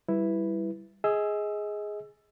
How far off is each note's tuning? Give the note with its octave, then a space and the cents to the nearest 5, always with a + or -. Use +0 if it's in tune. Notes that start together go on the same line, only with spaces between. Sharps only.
G3 +0 E4 +0 B4 +0
G#4 +0 D#5 +25 E6 +20